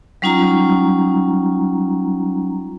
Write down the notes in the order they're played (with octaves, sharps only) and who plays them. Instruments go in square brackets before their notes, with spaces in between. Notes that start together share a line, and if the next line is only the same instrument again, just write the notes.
[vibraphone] F#3 G3 C#4 D#4 F4 A#5